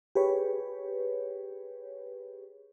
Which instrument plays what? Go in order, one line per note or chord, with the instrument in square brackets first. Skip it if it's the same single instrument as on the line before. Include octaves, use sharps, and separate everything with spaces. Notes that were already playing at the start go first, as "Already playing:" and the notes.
[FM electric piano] G4 G#4 B4 C#5